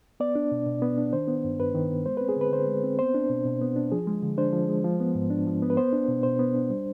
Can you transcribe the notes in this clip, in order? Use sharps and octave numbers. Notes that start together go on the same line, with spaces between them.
B3 D5
D4
B2
B2
B3
D4
D#3 C5
B3
G2
G2 B4
D#3
B3
G#3 C5
C4 B4
G#4
D3 B4
D3 C5
G#3
C4
B3 C5
D4
B2
B2
B3
D4
F3 G#4
G#3
D3
D4 C5
F3
G#3
F3
B3
G#2
D4
F3
B3
B4
B3 C5
D4
B2
B2 C5
B3
D4
G3